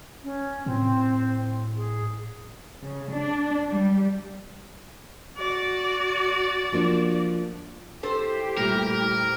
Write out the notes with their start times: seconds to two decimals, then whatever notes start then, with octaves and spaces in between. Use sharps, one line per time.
0.24 C#4
0.66 A2 C4
1.77 G#4
2.83 C#3
3.12 D4
3.69 G3
5.38 F#4 D5
6.72 F3 A#3 D4
8.03 C4 E4 G4 A4 C5
8.57 A#2 G3 A3 A#4